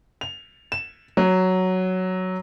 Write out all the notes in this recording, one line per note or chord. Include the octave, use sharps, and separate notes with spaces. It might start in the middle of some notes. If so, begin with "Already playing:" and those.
F7
E7
F#3